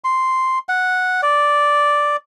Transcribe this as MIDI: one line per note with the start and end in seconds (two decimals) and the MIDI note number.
0.04 0.59 84
0.69 1.21 78
1.23 2.16 74